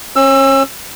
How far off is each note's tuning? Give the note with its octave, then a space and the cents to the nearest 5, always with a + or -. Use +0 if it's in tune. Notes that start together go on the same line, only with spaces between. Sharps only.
C#4 -35 E6 +20